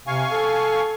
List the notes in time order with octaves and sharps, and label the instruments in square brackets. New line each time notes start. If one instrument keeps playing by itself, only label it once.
[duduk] C3 [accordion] F5 G#5 C#6
[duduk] A4